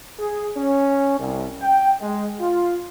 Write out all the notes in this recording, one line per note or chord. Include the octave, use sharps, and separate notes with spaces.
G#4
C#4
C2
G5
G#3
F4